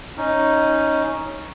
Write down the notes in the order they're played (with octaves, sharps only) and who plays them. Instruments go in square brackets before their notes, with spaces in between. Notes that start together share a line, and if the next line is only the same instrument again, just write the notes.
[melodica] C#4 D#4